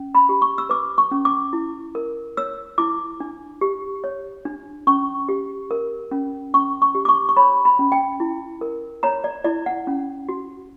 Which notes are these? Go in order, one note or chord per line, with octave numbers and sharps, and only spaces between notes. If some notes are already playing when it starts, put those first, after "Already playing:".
Already playing: C#4
B5
G4
C#6
E6
B4 D6
C#6
C#4
D6
E4
A#4
C#5 E6
E4 D6
D4
G4
C#5
D4
C#4 C#6
G4
A#4
C#4
C#4 C#6
C#6
G4
D6
C#6
C#6
C#5 B5
B5
C#4
G5
E4
A#4
C#5 A#5
D5
E4 D5
F#5
C#4
F#4